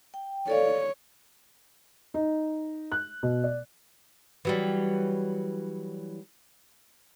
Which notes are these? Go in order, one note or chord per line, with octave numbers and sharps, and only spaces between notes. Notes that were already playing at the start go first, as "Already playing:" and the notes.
G5
A4 C#5 D5 F5
D#4
F#6
B2
D5
E3 F#3 G3